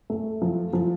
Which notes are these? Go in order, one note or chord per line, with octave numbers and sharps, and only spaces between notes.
A3
F3
F3